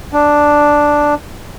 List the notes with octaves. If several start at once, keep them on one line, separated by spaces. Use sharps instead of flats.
D4